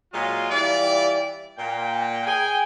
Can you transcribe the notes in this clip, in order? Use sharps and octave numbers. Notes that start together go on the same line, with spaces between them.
A#2 F#3 G#3 F4
E3 G3 F4 D5
A#2 G5
G#4 G5 G#5